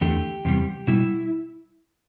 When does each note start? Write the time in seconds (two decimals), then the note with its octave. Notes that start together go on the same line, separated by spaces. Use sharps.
0.01 E2 D3 A3 G4
0.45 E2 C3 G3
0.87 B2 G3 E4